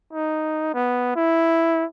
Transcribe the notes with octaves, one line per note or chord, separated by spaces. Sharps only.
D#4
B3
E4